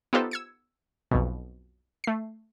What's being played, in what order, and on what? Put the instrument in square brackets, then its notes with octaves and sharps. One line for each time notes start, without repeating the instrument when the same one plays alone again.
[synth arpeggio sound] B3 D#4 F4 G4 A4 C5
E6 G#6 C#7
B1 F2 B2
A3 C7